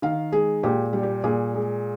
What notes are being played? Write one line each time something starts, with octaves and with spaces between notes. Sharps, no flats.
D#3 F5
G#3 G#4
A#2 G4
G3
G4
A#2 G#4
G#3